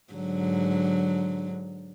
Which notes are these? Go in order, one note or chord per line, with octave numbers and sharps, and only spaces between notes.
G#2 D3 F#3